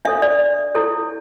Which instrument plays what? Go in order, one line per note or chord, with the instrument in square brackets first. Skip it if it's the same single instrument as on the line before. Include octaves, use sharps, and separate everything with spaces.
[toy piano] D4 A4 C#5 E5
D5
E4 A4 C#5